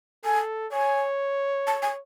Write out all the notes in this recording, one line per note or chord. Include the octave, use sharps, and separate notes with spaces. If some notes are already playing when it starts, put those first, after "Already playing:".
A4 G#5
C#5 G#5
A5
G#5